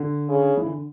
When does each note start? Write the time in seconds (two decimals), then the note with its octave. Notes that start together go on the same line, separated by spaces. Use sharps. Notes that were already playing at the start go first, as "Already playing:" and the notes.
Already playing: D3
0.28 C#3
0.57 E3
0.65 D3